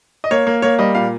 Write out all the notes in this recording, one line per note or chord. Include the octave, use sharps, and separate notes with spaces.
D#5
A#3 C#5
A#3
A#3 C#5
G3 D#5
A#2 F5